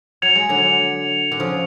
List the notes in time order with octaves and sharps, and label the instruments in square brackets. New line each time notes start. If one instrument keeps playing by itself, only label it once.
[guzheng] F#3 [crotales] G#6 C#7 F7
[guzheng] G#3
D3 F#3
D3
C#3 F3